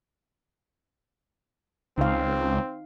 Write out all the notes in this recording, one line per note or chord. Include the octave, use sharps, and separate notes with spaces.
C#2 C4 D#4 F5